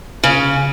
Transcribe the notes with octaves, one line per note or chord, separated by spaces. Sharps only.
C#3